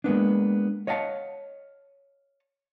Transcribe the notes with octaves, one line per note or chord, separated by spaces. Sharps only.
G#3 A#3 B3 D4
C#5 D#5 F5 F#5 A5